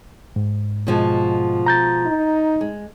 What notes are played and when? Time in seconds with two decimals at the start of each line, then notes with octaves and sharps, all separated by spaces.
0.36 G#2
0.87 B2 F3 G#3
1.66 A#5 G6 A6
2.07 D#4
2.61 G#3